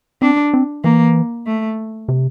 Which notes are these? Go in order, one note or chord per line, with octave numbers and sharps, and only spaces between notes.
C4 D4
C4
E3 A#3
A3
C3